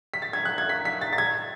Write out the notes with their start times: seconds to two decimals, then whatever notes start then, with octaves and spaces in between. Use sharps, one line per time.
0.14 B6
0.22 A6
0.33 G#6
0.45 F#6
0.58 G#6
0.69 B6
0.85 B6
1.01 A6
1.13 A6
1.18 G#6